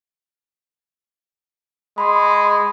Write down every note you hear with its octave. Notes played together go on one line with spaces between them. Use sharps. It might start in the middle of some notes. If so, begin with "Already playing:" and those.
G#3 B5 C6